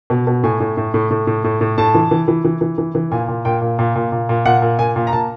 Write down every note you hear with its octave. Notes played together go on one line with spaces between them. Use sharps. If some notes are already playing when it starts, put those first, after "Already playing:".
B2
B2
A2 G#5
A2
A2
A2
A2
A2
A2
A2
A2 A5
E3
E3
E3
E3
E3
E3
E3
A#2 G#5
A#2
A#2 G5
A#2
A#2
A#2
A#2
A#2
A#2 F#5
A#2
A#2 G#5
A#2
A#5
A#2 A5